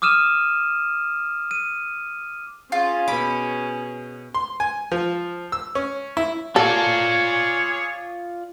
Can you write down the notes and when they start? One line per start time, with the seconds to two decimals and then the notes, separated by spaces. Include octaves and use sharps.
0.02 D6 D#6 F6 D#7 E7
1.51 D#7
2.72 C#4 F4 G#4
3.08 B2 B5 D6
4.35 C6
4.60 G#5
4.92 F3
5.52 E6
5.75 C#4
6.17 E4
6.56 F4 G#4 A4 C#5 D5